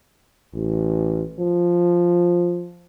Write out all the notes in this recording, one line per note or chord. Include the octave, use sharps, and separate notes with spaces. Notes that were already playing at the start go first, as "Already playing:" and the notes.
A1
F3